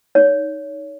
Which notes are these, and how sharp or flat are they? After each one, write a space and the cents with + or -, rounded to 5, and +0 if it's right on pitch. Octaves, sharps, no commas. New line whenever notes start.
D#4 +0 C#5 +25